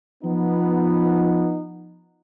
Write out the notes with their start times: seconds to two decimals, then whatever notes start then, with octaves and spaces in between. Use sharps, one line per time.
0.24 F3 B3 D#4